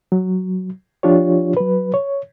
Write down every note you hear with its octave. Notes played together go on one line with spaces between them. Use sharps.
F#3
F3 D4 F4 G4 C#5
F#3 B4
C#5